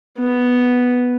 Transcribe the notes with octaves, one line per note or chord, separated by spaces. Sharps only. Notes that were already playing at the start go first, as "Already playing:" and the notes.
B3